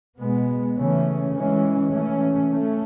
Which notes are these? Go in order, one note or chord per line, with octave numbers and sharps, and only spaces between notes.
B2 G#3 B3
C#3 E3 A3 C#4
E3 G#3 C#4
E3 A3 C#4
A3 C#4